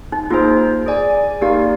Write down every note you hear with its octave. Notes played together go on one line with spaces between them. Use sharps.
D#4
A#3 D#4 F4 G#4 C5
G#4 D5 G#5
A#3 D#4 G4 A#4 D5 F5